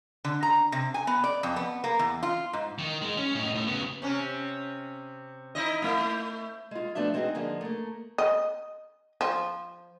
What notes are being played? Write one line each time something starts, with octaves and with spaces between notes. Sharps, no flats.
D3
A#5
C3
G#5
B3
D5
F2
B3
A#3
E2
F4
G#2
D#3
G#3 D#4
C#4
A2 D#4
A2
C#3 B3
C3 C#4
D#4 E4 D#5
A3 E4
G#3 F4
F3 A3 B3 D4 E5
G#3 C4 D#4 F#4 G#4
D3 F3 G#3 A#3
A3 A#3
D#5
F3